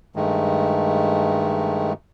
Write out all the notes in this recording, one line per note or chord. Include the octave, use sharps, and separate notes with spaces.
G2 D#3 G#3 A3